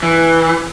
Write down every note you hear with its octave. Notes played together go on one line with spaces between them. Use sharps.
E3